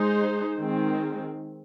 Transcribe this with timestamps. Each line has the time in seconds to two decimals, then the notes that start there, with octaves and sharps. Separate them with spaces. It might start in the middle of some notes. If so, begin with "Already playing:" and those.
Already playing: G#3 D#4 G#4 C5
0.60 D#3 G#3 C4